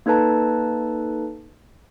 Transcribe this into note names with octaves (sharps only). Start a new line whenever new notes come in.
A#3 D#4 A4 B4 A5 A#5